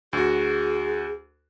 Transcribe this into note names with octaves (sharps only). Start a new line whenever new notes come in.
D2 F#4 G#4